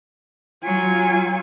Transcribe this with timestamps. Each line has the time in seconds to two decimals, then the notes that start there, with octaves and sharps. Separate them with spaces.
0.64 F#3 F4 G#5